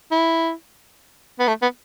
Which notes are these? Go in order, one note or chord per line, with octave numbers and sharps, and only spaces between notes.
E4
B3
A3
B3